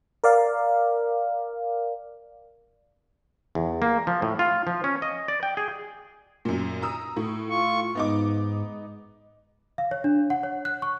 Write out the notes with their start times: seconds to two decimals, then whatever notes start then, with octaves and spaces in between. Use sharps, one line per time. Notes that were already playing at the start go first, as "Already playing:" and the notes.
0.24 A#4 D5 F5
3.55 E2
3.82 A#3
4.07 F3
4.22 A2
4.39 F4
4.67 F3
4.84 C#4
5.02 D#5
5.28 D5
5.43 G5
5.57 G#4
6.45 F#2 A#2
6.82 A#5 D#6 E6
7.17 A2
7.50 F4 C#6
7.95 G#2 B3 D#4 D6
9.78 F5
9.91 C#5
10.04 D4
10.30 F#5
10.43 C#5
10.65 F#6
10.82 C#6